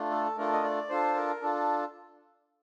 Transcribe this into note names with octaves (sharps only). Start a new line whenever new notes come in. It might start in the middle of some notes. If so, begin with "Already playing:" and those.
Already playing: A3 D4 F4
A4
A3 D4 F4 A4 A#4
D#5
D5
D4 F4 A4 C5
A#4
D4 F4 A4